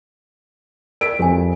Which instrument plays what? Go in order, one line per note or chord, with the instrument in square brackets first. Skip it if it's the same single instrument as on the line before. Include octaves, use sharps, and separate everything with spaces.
[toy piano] A#4 D5 [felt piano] B6 D7
[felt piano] F2 [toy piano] G4 G#5